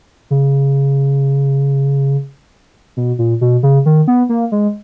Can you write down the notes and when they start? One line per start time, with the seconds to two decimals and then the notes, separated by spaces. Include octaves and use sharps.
0.30 C#3
2.97 B2
3.18 A#2
3.41 B2
3.63 C#3
3.86 D#3
4.08 B3
4.29 A#3
4.52 G#3